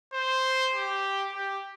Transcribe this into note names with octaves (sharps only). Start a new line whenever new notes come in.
C5
G4
G4